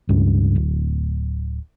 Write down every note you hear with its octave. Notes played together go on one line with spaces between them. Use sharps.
C#2 G2
D1